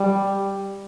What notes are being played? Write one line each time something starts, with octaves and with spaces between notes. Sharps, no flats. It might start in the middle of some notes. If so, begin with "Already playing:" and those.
Already playing: G3